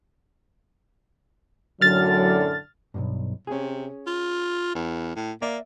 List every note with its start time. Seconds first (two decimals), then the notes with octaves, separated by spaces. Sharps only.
1.81 F#2 A2 D3 F#3 F6 A6
2.94 B1 E2 G2
3.47 C3 C#4 G#4
4.07 F4
4.75 E2
5.16 A2
5.42 A#3 D5 E5